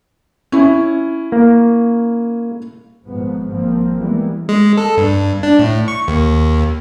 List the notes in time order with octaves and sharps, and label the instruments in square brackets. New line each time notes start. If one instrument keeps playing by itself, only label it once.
[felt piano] C#4 E4
[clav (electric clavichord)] A#3
[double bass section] G#1 G#2 F3 B3
G#1 F3 A#3 C4
E3 G3 G#3 A#3 B3
[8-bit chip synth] G#3
A4
G2
D4
A2
C#6
D#2